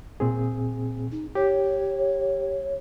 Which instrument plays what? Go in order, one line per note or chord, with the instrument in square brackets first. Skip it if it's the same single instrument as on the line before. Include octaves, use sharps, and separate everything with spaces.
[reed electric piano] A#2 C4 G#4
[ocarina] D#4
[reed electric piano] G4 [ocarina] C#5